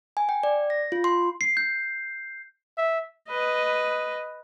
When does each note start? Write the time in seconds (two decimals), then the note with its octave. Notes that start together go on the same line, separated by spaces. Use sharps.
0.17 G#5
0.29 G5
0.43 D5
0.70 A#6
0.92 F4
1.04 C6
1.41 C7
1.57 G6
2.78 E5
3.29 B4 D#5